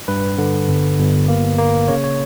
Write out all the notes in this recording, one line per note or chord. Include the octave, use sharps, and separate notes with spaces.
G2 B4
D3
G1
G1
A#3
A#3
C#3 C#5
C#5